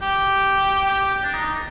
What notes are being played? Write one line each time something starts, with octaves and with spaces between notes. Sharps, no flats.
G4
G4
D4
D#4